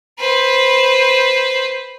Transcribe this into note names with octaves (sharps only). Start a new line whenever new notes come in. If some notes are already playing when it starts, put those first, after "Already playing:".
B4 C5